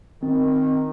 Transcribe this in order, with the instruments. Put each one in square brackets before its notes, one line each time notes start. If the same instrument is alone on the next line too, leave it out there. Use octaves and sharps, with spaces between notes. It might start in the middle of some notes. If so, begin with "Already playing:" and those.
[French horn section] D#3 [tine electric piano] C4